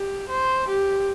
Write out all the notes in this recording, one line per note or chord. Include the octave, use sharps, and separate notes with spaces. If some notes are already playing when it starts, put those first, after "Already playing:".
Already playing: G4
C5
G4